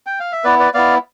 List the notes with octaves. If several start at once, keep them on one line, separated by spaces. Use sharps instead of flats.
G5
F5
E5
B3 E4 B4 D5
B4 D5
B3 E4 D5 F5